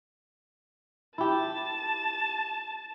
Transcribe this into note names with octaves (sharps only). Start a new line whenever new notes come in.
E4 G4 A5